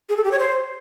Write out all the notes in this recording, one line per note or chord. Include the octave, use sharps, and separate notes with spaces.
G#4
A4
G4
C#5
C5